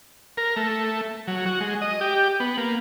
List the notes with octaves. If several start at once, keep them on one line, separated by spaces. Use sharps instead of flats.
A#4
A3
F#3
F#4
G#3
D#5
G4
B3
A#3